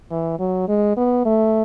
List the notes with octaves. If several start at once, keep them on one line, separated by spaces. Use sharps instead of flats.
E3
F#3
G#3
B3
A3